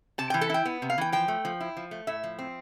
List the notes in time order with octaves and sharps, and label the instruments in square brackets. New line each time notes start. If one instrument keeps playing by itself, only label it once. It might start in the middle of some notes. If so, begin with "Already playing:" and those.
[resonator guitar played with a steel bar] C3 A5
E3 G5
A4
E4 G5
B3
C3
F5
E3 G5
F3 G5
A3
F3
E4
F3
A3
A2 E5
F3
C4